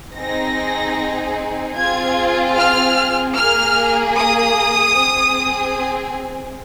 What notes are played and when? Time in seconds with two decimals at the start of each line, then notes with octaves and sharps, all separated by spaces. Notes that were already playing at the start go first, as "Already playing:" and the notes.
0.16 C4 D#4 G#4 A#6
1.76 C4 F4 G#4 G#6
2.56 F6
3.36 A#3 G#4 F6
4.16 D#6
4.97 C4 G#4